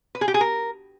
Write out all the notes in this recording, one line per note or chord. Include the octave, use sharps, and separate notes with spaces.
B4
G#4
G4
G#4
A#4